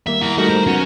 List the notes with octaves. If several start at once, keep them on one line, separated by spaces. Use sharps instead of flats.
D#3 G3 A#3 E5
E4 F#5 A#5
G3 A3 D#4 F#4 A#4 A#5
C5
F#3 B3 C#4 F#4